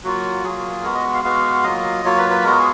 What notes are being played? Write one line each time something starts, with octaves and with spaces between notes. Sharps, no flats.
F#3 A#3 F4 F#4
F#3 A#3 F4 G#4
G#3 B3 F#4 A#4
D#5
F5
G#3 B3 F#4 F5
F#3 A#3 F4 D#5
F#3 A#3 F4 C#5
B4
B4
G#3 B3 F#4 A#4
G#4